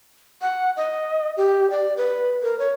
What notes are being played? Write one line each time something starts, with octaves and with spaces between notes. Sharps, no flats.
F#5
D#5
G4
D5
B4
A#4
C#5